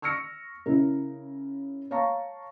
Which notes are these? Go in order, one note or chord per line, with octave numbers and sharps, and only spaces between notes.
C#6 E6 F6 A#6 C#7
C#3 E4 A#4
C#5 F5 A5 A#5 C#6